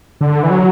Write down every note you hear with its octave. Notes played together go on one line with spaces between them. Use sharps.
D3
E3
F#3